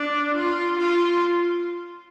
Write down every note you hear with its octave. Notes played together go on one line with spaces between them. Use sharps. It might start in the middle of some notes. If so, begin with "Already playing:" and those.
Already playing: D4
F4
F4